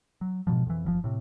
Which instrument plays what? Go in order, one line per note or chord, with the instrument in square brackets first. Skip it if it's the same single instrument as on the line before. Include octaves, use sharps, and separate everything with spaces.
[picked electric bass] F#3
G#2 B2 D3 F3
F2 E3
F#1 A#2 F3
A2 C3